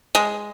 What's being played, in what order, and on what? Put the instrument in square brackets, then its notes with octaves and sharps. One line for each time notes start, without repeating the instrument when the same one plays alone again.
[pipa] G#3